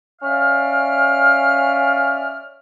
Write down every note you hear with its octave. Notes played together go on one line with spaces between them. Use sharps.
C#4 D5 E5 F5 F6